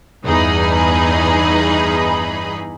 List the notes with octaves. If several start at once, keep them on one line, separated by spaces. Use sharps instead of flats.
E2 G2 E3 D#4 G#4 B5